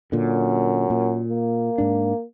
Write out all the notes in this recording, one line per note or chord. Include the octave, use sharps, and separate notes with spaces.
F#2 A#2 D3
A#2
A#3
G#2 D4